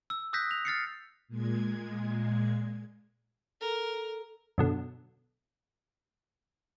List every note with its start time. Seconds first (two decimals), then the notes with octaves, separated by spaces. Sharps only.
0.10 E6
0.33 D#6 E6 F#6 G6 A#6 B6
0.51 F7
0.65 F6 A6 C7 C#7
1.28 A#2 G#3 G#6
3.61 A4 A#4
4.58 F#2 B2 D3